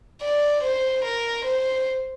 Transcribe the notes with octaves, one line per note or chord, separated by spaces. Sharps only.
D5
C5
A#4
C5